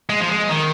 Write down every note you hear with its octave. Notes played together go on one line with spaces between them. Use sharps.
G#3
F3
G#3
D#3